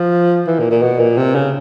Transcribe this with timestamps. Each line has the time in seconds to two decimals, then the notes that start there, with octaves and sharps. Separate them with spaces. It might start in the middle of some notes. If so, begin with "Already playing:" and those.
Already playing: F3
0.47 E3
0.59 A#2
0.71 A#2
0.82 B2
0.99 A#2
1.17 C3
1.35 C#3